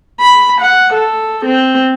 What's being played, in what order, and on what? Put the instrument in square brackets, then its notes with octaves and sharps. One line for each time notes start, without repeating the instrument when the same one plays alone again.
[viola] B5
F#5
A4
C4